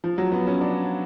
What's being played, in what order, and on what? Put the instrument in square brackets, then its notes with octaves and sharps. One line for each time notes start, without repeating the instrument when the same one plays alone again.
[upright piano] F3
F#3
B3
C#4
D4